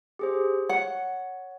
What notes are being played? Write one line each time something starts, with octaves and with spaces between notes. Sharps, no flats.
G4 G#4 C5
C#5 F#5